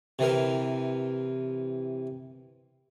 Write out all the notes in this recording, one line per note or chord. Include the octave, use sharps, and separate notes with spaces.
C3 E3 A#4